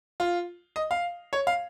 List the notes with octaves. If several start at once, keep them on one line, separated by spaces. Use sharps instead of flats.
F4
D#5
F5
C#5
F5